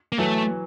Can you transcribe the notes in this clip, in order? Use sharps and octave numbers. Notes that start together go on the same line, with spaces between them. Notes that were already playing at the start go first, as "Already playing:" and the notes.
A#3
E3 F#3 A3